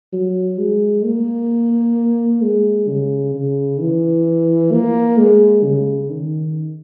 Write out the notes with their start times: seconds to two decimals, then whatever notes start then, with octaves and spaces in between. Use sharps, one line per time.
0.13 F#3
0.58 G#3
1.05 A#3
2.42 G#3
2.88 C#3
3.34 C#3
3.80 E3
4.72 A#3
5.18 G#3
5.64 C#3
6.10 D#3